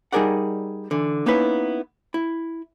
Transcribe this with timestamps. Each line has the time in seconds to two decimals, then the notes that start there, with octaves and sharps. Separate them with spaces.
0.12 G3 D#4 G#4 A#4 D5 F#5
0.91 D3 E3
1.26 A#3 B3 C#4 D#4 E4 B4
2.14 E4